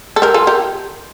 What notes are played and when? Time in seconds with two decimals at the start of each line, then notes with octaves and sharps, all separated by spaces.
0.16 A4
0.22 G4 A#4
0.34 F4 A4
0.47 G4 A#4